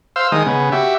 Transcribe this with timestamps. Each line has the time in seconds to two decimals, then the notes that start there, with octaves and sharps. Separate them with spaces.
0.16 C5 F5 E6
0.32 D#3 G#3 D#6
0.46 C#3 B3
0.72 F#4 G4 E5